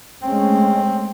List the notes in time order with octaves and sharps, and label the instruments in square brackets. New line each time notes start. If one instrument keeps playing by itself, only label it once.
[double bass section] G#3 A3 C#4 [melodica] C4